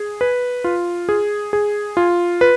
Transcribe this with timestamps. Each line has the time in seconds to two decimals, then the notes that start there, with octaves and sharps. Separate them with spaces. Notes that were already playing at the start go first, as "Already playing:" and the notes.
Already playing: G#4
0.21 B4
0.64 F4
1.09 G#4
1.53 G#4
1.97 F4
2.41 B4